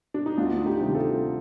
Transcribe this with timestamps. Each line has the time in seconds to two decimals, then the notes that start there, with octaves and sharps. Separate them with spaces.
0.14 D4
0.26 D#4
0.38 D2 D4 F4
0.66 D#4 G4
0.80 C3 D#3 G3
0.94 F4 A4